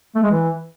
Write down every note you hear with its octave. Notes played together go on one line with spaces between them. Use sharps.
A3
G#3
E3